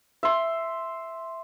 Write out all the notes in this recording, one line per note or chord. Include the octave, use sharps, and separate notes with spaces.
E5 C6